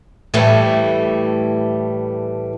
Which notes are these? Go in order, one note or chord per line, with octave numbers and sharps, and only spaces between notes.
A2 E3 G3 A3